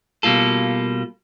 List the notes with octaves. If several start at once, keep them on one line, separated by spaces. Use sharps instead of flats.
B2 G3 A#3 F4 A4